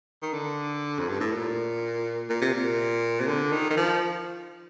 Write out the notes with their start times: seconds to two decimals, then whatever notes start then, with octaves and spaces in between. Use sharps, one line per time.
0.22 D#3
0.33 D3
0.99 F2
1.09 G2
1.20 A2
1.32 A#2
2.30 A#2
2.41 C3
2.53 A#2
3.20 C3
3.27 D3
3.52 D#3
3.70 D#3
3.77 F3